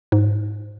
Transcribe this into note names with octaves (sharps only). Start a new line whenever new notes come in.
G#2